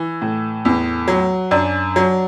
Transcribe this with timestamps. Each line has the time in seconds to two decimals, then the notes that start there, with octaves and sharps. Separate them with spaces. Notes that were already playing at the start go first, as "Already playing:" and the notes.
Already playing: E3
0.22 A2
0.65 E2
1.08 F#3
1.51 F#2 D4
1.96 F#3